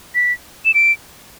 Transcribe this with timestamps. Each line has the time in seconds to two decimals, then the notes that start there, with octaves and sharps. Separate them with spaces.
0.15 B6
0.65 E7
0.74 D7